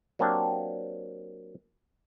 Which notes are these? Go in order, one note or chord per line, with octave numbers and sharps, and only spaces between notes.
F#3 A#3 C4 D4 G4